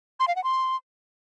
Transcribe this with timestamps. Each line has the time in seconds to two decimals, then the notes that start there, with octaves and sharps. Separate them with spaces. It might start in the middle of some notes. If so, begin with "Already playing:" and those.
0.20 C6
0.28 F5
0.36 F#5
0.44 C6